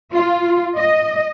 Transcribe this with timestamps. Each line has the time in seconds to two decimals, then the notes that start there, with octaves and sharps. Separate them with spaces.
0.13 F4
0.77 D#5